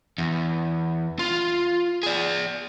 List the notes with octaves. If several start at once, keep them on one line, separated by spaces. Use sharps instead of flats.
E2
F4
G#4 D5